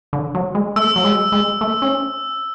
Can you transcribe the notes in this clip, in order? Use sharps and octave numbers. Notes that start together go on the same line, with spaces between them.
D3
F#3
G#3
A3 E6
F#3
G#3
G#3
A3
C#4